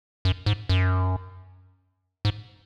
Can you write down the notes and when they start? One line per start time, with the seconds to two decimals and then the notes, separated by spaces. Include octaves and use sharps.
0.25 F#2
0.46 G#2
0.69 F#2
2.25 G#2